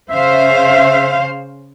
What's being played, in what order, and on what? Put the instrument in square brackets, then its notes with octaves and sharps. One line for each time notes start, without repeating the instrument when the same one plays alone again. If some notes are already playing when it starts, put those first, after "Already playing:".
[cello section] C#3 C5 F5 [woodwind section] E5